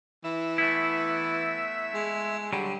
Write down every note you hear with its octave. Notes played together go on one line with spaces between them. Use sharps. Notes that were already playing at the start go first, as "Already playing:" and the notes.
E3 E5
A3 B3 E4
G#3
D3 F#3 G3